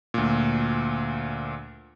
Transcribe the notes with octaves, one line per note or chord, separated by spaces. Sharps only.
D2 A#2